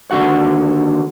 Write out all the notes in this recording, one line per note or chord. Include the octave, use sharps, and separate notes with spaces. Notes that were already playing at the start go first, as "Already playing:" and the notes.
D#2 D3 E3 F#4 F#5